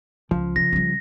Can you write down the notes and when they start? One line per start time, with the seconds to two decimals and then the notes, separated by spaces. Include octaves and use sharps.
0.31 C#2 F3
0.56 C#3 A#6
0.72 C#3 G3